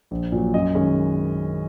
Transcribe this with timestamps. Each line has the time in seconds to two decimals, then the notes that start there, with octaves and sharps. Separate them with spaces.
0.11 A#1
0.32 A#2 F#3
0.54 F#2 D#5
0.75 D#3 G#3 C#4